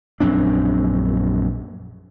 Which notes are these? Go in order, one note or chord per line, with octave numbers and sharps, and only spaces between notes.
A#1 F#2 C4 D4